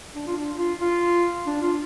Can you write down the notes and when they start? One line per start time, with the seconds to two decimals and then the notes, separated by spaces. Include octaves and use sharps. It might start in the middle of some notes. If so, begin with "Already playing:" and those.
0.14 D4
0.27 F4
0.37 D4
0.58 F4
0.81 F4
1.46 D4
1.62 F4